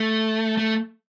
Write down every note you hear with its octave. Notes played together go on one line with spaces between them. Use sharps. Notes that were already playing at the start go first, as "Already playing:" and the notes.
Already playing: A3
A3